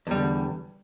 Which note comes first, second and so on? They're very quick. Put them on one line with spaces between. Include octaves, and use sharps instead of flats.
E2 G3 D3